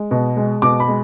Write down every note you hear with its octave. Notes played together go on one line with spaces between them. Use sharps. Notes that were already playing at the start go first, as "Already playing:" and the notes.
Already playing: G#3
B2
G#3
B2 D6
B5
G#3